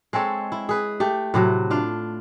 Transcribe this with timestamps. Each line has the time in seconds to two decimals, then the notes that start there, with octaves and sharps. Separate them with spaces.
0.13 G#3 C4 A4 C#5
0.52 E4
0.69 G#4 B4
1.00 A3 G4
1.34 A2 C3 F#3
1.71 D4 F4 F5